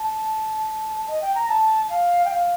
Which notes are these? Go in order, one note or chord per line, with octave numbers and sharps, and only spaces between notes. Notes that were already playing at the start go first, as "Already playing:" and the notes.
Already playing: A5
D#5
G5
A#5
A5
F5
G5
F5